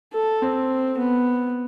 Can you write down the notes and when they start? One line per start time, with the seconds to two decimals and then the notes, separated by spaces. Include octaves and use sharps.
0.13 A4
0.42 C4
0.98 B3